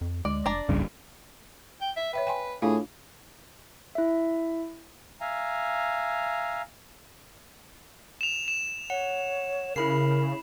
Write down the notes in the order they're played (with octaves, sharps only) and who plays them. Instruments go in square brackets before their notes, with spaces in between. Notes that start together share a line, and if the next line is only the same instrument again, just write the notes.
[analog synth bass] F2
[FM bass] D2 [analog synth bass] G#3 [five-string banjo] D5
[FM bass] F1 [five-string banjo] D4 D5 A#5
[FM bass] F1 [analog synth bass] C2 [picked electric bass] G2 C#3
[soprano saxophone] G5
E5
[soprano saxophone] B4 [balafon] C#5 E5 G5
[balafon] G5 G#5 C6
[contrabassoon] A2 [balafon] D4 F4 F5 [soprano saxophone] G#4
[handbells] E4 E5
[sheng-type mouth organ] E5 F5 G#5 A#5
[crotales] E7 F7
E7
[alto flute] C#5 [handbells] F#5
[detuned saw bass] C#3 [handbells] E4 B5 C7 [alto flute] A#4